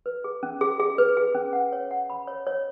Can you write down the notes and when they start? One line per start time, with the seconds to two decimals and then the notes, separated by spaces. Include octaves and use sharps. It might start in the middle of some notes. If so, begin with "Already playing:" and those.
0.06 B4
0.24 G#4
0.43 C#4
0.61 G#4
0.80 G#4
0.98 B4
1.17 G#4
1.35 C#4
1.53 F#5
1.73 C#5
1.91 F#5
2.10 B5
2.27 C#5
2.47 C#5